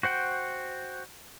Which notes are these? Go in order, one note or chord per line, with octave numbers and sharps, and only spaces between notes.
F#4 C5 F#5 G5